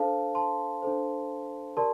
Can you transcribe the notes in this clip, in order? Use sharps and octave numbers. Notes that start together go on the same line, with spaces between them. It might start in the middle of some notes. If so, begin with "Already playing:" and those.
Already playing: D4 A4 C5 F5 A5
A5 C6
D4 A4 C5
G4 A#4 D5 A5 C6